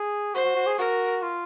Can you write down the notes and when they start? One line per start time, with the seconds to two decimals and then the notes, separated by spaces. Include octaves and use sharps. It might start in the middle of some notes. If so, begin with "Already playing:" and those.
Already playing: G#4
0.35 F#4 C5
0.45 F#4
0.56 F#4
0.67 G#4
0.78 F#4 A#4
1.22 F4